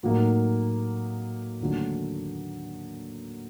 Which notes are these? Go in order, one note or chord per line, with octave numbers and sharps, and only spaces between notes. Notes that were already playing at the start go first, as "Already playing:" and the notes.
A2 F#3 A#3 D#4
D#2 D3 F#3 A3